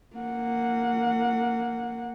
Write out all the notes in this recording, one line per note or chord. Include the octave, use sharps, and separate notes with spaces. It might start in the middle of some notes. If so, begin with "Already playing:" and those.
A#3 F#5